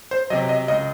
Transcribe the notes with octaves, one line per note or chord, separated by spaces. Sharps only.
C5
C3 F#3 D#5
D#5
C#2 D#5